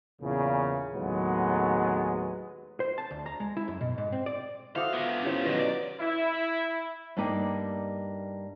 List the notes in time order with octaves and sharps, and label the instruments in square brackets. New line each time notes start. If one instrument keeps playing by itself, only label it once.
[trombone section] E2 A#2 C#3
D#2 A2 F#3 G#3 B3
[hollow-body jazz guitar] C5
A5
D2
A#5
G#3
E4
F#2
B2
G#2
C4
D5
[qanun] F#4 A4 C5 [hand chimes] E5 D6 D#6 [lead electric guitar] F5
[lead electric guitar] B3 F4 [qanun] G5
[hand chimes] C#4 E4 C#5 [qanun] G4 C5
[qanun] B2 [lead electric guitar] D#3 F#3
[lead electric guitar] D5 [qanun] A#5
[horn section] E4
[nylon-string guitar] G2 G3 A#3 D#4 D5 G5